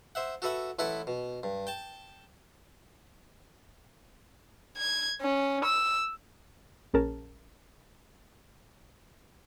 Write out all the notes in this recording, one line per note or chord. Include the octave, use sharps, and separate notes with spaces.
C5 E5 F#5
F#4 A4 B4 E5 F#5
A1 E4 A4 B4 F#5 B5
B2
G2
G5 A5
G#6
C#4
E6
A#1 C#4 G#4 A#4 A5